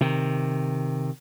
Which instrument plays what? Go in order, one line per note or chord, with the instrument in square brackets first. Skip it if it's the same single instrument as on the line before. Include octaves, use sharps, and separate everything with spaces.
[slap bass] C3 D#3